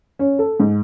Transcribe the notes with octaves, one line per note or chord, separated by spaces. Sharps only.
C#4
A4
G#2